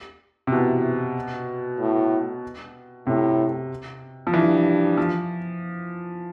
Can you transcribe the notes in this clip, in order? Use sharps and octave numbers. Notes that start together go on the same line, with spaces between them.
C3
B2 E3
A2
A2 C3
F3
G2 E3
F3